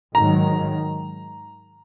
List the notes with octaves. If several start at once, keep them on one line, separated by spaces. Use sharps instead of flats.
G#2 D#3 F#3 A#5